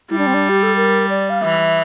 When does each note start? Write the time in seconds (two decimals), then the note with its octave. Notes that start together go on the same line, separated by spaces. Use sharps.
0.11 G3 E4
0.18 D4
0.27 C4
0.34 D4
0.49 G4
0.63 A4
0.76 A#4
1.09 D5
1.30 F5
1.42 E3 E5